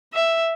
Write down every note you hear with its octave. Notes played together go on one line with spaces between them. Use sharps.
E5